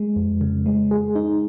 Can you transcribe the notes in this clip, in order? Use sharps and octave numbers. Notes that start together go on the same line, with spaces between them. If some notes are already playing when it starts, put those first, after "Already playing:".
Already playing: G#3
F2
C#3
G#3
G#4
D#4